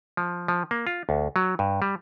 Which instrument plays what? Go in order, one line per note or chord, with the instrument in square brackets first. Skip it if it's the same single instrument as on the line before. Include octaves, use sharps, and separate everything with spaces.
[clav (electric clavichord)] F3
F3
A#3
F4
D2
F#3
G2
G3